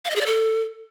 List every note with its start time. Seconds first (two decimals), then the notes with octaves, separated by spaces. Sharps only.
0.05 F5
0.10 D#5
0.16 G#4
0.21 D5
0.26 A4